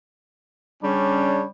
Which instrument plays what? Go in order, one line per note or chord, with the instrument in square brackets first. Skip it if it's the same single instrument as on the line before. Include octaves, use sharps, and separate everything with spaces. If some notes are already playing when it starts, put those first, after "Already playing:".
[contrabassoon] C#3 [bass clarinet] G3 [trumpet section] C#4 D4 C#5